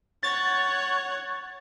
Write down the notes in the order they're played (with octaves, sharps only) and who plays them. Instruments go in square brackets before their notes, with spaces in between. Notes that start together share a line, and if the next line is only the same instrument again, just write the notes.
[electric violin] C#5 F#5 [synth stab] A6